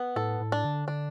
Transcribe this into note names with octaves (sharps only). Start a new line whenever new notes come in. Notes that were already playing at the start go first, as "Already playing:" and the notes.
Already playing: B3
A2 A4
A2
D4
D3
D3 D4